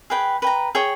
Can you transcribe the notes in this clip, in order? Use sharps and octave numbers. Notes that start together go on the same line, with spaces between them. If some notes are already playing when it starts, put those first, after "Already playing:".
G#4 B4 G5
B4 G5 A#5
G#4 C#5 G5